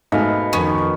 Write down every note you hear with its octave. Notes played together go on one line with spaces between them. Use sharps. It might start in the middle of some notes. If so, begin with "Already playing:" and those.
G#2 B2 A3 F5
F2 D#3 B3 C#4